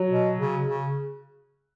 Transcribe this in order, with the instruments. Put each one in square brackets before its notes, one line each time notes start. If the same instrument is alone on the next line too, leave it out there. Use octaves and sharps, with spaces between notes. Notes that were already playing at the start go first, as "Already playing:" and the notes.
Already playing: [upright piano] F#3
[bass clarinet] B2
C#3
C#3